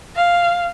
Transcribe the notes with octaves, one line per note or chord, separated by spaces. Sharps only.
F5